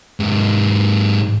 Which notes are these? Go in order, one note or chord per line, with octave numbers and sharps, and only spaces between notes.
G#2 G4